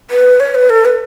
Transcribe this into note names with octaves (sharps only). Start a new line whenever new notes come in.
B4
C#5
B4
A4
B4